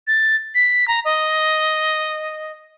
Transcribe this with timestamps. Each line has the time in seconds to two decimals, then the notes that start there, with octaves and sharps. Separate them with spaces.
0.07 A6
0.55 B6
0.88 A#5
1.05 D#5